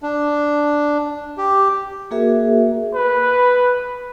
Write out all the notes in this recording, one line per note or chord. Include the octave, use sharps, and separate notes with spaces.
D4
G4
A#3 F#4 G#4 A#4 E5
B4